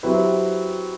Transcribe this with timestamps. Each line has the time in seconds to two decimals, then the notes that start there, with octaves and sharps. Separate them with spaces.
0.03 F#3 C4 E4 G4 B4